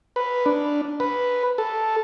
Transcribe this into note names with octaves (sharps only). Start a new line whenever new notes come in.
B4
D4
B4
A4